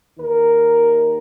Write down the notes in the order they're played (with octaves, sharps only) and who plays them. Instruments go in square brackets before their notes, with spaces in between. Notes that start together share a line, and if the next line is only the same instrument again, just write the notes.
[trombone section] D#2 D#3 A#4